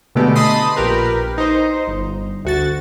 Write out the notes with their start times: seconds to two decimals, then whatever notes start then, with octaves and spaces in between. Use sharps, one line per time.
0.15 B2 D3 G#3 A3 B3 G4
0.35 D#5 A5 B5 C6 D#6 C7
0.76 A#1 G4 A#4 B4
1.38 D#4 C5
1.87 G1
2.45 D2 F#4 A6